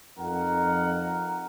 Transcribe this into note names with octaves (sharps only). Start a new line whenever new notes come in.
F2 D#4 A#4 F#5